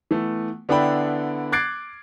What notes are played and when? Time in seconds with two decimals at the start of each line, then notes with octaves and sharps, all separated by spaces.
0.11 E3 A3 B3
0.69 D3 B3 D4 E4 G5 B5
1.52 D6 F#6 G#6 A6 C7 D7